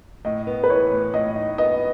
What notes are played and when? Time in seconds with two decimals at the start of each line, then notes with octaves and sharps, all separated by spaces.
0.25 A2 D#5
0.47 B3
0.63 B4
0.70 E3 C#5
0.91 A2
1.14 A2 D#5
1.36 D#4
1.58 B3 D#5